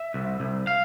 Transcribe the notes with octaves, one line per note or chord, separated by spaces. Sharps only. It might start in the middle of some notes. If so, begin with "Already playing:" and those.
Already playing: E5
C2
C2
F5